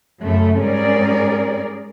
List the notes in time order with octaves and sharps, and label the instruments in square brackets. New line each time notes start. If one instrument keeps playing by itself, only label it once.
[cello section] F#2 C#3 A3
G#2 G3 C#4 G#4 A#4 D5